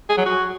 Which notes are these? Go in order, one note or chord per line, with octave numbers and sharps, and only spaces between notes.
G#4
F#3
F#4